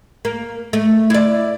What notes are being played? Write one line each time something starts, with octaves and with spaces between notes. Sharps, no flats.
A#3
A3
E4 D5